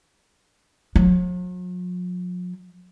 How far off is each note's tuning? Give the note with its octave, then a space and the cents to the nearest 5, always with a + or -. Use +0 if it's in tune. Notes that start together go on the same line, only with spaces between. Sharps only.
F#3 -45